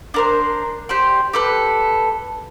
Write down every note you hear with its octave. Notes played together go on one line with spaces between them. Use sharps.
D4 A#4 C5
G4 C5 D5
G4 A4 B4